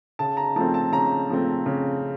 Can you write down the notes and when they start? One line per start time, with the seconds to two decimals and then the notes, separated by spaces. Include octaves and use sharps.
0.19 C#3 A5
0.37 A#5
0.56 F3 A3 C4 A5
0.74 A5
0.92 C#3 A#5
1.30 F3 A3 C4
1.66 C#3